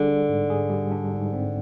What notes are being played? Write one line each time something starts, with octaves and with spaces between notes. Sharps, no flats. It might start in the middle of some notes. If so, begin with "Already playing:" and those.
Already playing: D3 G3 G#4
D4
G#2
G#4
G3
D4
G#2
C4